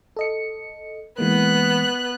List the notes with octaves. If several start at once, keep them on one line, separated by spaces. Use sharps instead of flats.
A4 D#5 C#7
E3 G#3 A#3 B3 F#6